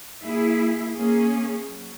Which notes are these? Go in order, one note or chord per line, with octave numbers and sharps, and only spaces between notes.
A#3 E4 G#4
A#3 C#4 G#4
F#3